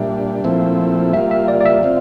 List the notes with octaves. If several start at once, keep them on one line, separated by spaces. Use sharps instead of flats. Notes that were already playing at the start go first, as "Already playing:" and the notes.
Already playing: A#2 G3 D4 E5
A#2 F3 A3 C4 E4
G3 A#3 F4 E5
E5
D5
D5
E5
C4 F4